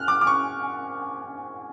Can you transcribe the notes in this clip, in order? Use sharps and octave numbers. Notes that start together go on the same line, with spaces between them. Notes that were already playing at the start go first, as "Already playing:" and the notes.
Already playing: F6 F#6
D6
D6
C#6